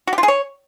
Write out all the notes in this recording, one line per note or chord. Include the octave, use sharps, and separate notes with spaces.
F#4
G4
F4
G#4
C#5